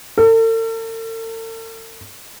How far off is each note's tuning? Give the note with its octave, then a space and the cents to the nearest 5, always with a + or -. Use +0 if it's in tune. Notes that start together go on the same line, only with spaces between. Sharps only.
A4 +45